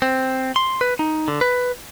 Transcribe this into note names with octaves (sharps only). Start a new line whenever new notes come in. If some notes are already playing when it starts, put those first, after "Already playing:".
C4
C6
B4
D#4
D3
B4